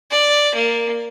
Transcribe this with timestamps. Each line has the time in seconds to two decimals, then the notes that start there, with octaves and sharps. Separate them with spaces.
0.11 D5
0.54 A#3